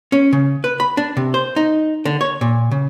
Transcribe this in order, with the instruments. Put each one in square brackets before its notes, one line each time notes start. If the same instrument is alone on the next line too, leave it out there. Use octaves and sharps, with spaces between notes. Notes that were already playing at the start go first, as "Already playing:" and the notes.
[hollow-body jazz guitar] C#4
C#3
B4
B5
D4
C3
C5
D#4
D3
C#5
A#2
C#3